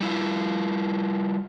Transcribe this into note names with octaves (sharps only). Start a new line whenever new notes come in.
G3 E4 F4